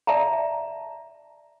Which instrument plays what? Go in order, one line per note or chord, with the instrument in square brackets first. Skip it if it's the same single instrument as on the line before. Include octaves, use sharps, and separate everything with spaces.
[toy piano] D5 E5 A5 A#5